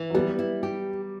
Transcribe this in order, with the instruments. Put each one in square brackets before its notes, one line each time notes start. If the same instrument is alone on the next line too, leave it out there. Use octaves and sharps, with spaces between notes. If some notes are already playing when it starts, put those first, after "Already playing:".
Already playing: [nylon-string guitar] E3
[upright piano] F#3
[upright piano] G3 [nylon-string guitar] B3
[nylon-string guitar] E4
G4